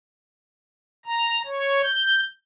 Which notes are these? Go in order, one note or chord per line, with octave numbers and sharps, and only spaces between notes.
A#5
C#5
G6